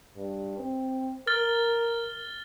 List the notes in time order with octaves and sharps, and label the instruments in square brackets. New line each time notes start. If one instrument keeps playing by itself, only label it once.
[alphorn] G2
C4
[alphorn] A#4 [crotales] F6 A6 G7